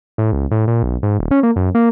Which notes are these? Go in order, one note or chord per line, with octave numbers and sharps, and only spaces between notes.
A2
C#2
A2
A#2
B1
G#2
D#1
C#4
A#3
F#2
A#3